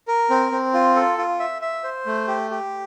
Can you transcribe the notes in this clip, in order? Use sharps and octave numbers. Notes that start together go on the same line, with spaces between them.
A#4
C4
C4
F4
A4
F4
E5
E5
C5
A3
G4
G4